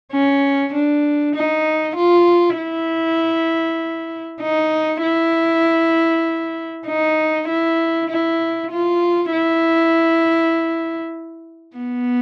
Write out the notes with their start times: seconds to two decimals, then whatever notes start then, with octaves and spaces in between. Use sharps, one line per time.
0.13 C#4
0.74 D4
1.35 D#4
1.96 F4
2.57 E4
4.42 D#4
5.03 E4
6.87 D#4
7.48 E4
8.10 E4
8.71 F4
9.32 E4
11.77 B3